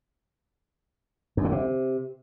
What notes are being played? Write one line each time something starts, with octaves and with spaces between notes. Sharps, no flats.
F#2
D3
C3